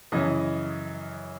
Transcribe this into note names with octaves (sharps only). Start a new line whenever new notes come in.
F#2 C#3 E3 D#5